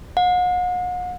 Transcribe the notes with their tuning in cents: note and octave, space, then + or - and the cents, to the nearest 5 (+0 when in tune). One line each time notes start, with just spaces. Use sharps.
F#5 -40